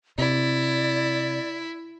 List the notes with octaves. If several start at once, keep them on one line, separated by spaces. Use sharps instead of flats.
C3 E4 D5